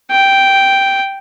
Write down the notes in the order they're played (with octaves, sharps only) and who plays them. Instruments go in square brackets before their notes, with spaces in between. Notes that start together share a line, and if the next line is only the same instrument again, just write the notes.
[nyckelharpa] G5